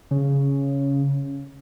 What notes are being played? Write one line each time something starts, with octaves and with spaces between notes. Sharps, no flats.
C#3